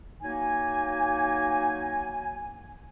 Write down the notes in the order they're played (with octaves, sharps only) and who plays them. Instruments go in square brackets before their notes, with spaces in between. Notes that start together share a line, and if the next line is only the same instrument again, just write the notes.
[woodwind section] F#3 A#3 D#4 G#5